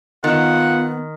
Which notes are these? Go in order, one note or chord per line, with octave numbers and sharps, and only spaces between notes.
D#3 B3 F4 F#5